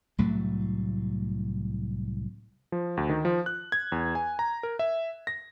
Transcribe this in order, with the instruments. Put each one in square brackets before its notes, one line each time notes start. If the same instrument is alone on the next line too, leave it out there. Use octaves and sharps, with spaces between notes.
[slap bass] C2 A2 F#3 A3
[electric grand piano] F3
D2
D#3
F3
F#6
G#6
E2
G#5
A#5
A#4
E5
A#6